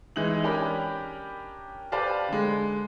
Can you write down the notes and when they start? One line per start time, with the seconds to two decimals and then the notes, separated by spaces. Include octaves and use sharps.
0.16 E3 G#3 D#4 F#7
0.44 C#4 D4 G4 A#4 G5 B5
1.92 G4 B4 C5 D5 F5 A5
2.28 D3 G#3